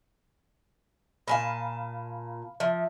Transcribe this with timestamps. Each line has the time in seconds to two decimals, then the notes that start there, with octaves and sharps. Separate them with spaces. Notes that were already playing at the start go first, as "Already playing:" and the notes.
1.28 A#2 F5 G#5 A5 B5
2.60 F3 E5